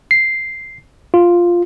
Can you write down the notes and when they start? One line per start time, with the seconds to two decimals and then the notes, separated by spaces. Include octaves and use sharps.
0.11 C7
1.14 F4